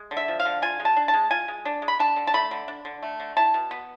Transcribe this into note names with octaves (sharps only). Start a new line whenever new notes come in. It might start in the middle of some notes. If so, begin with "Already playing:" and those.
Already playing: G#3
D3
E5
F3
F5
D3
F4 G#5
G#3
A5
D4
A5
G#3
F4 G#5
G#3
D4
G#3
B5
D4 A5
D3
A5
A3 B5
D3
D4
D3
A3
D3
E4 A5
B2
B3